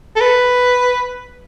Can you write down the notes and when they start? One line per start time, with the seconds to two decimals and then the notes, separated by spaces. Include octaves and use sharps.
0.16 A4
0.21 B4